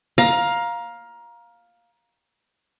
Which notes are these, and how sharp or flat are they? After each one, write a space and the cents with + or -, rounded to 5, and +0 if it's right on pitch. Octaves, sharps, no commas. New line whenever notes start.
F5 +10 A#5 +20